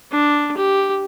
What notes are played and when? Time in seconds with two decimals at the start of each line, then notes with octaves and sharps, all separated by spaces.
0.11 D4
0.57 G4